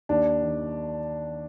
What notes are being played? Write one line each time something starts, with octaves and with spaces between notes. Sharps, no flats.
D#2 D4
D#3